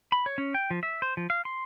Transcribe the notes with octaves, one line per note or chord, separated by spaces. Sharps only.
B5
C#5
C#4
G5
F3
E5
C5
F3
F5
C6